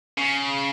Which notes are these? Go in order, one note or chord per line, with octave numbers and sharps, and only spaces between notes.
C#3